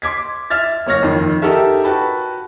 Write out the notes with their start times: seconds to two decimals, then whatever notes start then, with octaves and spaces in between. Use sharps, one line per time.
0.02 C6 D6 G#6 B6
0.50 E5 F6 G#6 A6
0.86 F#1 C#5 F6 A#6
1.03 F2 D#3
1.42 D#4 G4 A4 A#4 E5
1.84 F#4 B4 G5 A5 B5